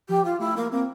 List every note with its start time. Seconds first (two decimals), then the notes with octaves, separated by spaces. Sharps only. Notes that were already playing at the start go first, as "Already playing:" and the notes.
0.09 F3 G4
0.25 F4
0.40 A3 E4
0.57 A#3
0.72 A#3 C4